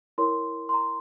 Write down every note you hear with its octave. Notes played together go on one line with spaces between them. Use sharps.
E4 A#4 C#5 C6
C6
A#5